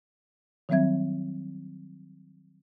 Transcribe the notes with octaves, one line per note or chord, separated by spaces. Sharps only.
D#3 F#3 G3 C4 E5 G#6